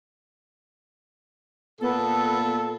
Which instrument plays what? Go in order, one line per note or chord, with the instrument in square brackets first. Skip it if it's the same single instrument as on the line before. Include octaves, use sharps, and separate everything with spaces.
[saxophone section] A#2 A4 [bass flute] B3